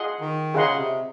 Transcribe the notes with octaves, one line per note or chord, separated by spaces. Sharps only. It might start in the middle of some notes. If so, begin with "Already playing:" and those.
Already playing: F4 G#4 D#5 F#5 C6
D#3
C#3 F4 G#4 D#5 F#5 C6
C3